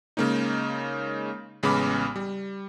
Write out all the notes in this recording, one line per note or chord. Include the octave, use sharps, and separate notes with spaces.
C#3 G#3 A#3 C#4 D#4
A1 C#3 G#3 B3 B5 D6
G3